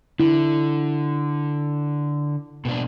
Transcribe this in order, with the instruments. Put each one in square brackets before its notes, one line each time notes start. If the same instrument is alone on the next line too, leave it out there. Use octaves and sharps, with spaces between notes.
[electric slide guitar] D3 [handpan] E4
[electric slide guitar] B2 A#3 D4